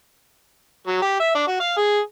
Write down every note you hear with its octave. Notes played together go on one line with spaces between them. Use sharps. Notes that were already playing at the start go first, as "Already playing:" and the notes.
F#3
G4
E5
D4
F#4
F5
G#4